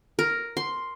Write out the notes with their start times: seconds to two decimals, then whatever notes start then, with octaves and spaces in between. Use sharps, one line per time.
0.19 A#4
0.57 C6